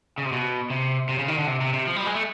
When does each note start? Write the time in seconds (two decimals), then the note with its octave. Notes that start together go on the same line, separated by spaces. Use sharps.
0.18 C#3
0.25 C3
0.32 B2
0.70 C3
1.09 C3
1.19 C#3
1.28 D#3
1.38 D3
1.47 C3
1.61 C3
1.74 C3
1.87 F3
1.96 G3
2.06 G#3
2.15 A3